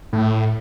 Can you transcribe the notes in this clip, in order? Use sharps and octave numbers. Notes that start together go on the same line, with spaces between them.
A2